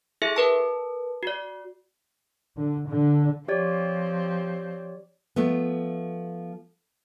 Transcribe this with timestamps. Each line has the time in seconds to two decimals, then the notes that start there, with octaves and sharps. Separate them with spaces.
0.22 E4 G#4 A4 E5
0.36 A#4 B4 A5
1.23 F#4 D5
2.57 D3
2.88 D3
3.48 F3 C4 G4 C#5 D5
5.36 F3 A3 B3